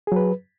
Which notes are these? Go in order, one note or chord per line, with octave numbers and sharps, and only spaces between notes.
F#3 G#4 B4